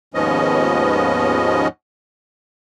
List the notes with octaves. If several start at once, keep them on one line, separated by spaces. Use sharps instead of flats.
D#2 G#2 F3 B3 C#4 D#5